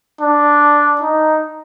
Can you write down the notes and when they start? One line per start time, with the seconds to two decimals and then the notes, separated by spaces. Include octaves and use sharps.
0.21 D4
1.01 D#4